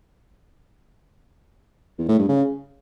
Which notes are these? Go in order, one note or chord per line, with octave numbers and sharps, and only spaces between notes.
E2
A2
G2
C#3